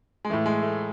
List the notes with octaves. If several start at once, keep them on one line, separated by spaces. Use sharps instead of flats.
G#3
A2 E3 A3
G#3
A3